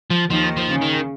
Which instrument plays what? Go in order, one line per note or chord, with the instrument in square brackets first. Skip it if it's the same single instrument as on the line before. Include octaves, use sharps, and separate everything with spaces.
[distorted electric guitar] F3
[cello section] D#2 D#3 [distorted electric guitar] F3
[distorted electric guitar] F3
[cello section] C#3
[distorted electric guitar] D#3